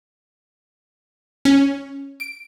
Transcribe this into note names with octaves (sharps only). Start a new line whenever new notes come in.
C#4
D7